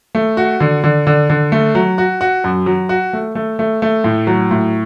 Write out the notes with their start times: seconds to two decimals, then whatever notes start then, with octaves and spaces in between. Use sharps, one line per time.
0.15 A3
0.37 F#4
0.60 D3
0.84 D3
1.07 D3
1.30 D3
1.52 A3
1.75 F#3
1.98 F#4
2.21 F#4
2.44 F#2
2.66 F#3
2.89 F#4
3.13 A3
3.35 A3
3.59 A3
3.82 A3
4.04 A2
4.27 F#3
4.51 A2